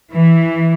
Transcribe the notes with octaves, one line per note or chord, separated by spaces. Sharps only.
E3